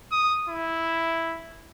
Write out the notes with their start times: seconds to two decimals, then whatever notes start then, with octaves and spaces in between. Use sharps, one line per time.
0.12 D#6
0.48 E4